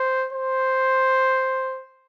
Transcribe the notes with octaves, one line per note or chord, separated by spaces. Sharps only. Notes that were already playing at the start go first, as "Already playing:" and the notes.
Already playing: C5
C5